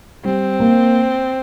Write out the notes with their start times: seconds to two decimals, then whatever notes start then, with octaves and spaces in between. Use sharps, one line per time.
0.25 G3 C4
0.60 A#3